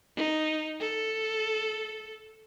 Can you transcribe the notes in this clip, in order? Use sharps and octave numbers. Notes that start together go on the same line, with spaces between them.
D#4
A4